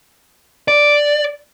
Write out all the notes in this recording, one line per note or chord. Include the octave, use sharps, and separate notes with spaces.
D5